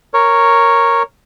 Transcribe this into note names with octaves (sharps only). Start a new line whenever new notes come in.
A#4 C#5